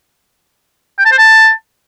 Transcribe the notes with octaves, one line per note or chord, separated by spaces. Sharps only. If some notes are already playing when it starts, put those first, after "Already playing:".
G5
A5
C5
A5